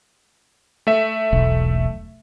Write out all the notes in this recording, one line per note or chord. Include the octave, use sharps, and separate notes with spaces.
A3 E5
E1 B1